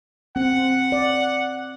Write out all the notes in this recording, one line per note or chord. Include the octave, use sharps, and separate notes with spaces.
C4 F#5
D5